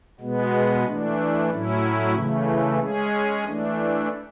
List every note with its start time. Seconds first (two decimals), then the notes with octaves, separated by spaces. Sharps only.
0.20 B2 G#3 B3
0.85 E3 A3 D4
1.50 A2 F#3 C#4 E4
2.14 C#3 E3 A3
2.80 G#3 C#4 G#4
3.44 E3 A3 D4